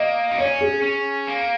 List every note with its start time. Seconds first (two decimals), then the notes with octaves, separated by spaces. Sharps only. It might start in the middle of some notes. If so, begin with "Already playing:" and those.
Already playing: A#3 D#5
0.32 D#4
0.38 C#4 C#5
0.61 G#4
0.82 C#4
1.28 A#3